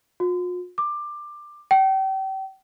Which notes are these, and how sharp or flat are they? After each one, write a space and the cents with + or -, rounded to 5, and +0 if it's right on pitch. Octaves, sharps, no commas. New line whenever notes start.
F4 +45
D6 +15
G5 -35